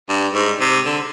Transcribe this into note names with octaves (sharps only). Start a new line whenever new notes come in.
G2
G#2
C3
D3